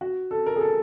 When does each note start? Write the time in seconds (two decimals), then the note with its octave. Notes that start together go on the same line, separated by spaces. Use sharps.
0.01 F#4
0.31 A4
0.46 A#4
0.56 G#4
0.61 A4